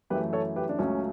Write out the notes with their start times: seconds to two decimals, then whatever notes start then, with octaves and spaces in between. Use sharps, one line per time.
0.10 F#2 E3 A3 G4 B4
0.33 A4 C#5
0.56 G4 B4
0.69 D4
0.79 C#2 C#3 F#3 A3 C#4